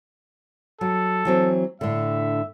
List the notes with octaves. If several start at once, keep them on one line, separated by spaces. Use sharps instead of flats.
F#3 A4
E3 F#3 C4
A2 D3 E5